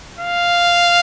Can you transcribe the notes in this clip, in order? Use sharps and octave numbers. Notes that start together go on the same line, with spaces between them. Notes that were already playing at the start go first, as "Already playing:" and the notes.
F5